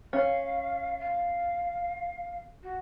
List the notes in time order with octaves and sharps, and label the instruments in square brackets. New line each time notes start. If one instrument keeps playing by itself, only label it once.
[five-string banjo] C#4 [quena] F5
[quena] F5
F#4